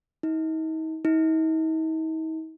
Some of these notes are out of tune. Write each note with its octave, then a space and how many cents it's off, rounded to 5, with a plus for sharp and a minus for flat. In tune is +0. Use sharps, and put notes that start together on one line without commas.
D#4 +40
D#4 +45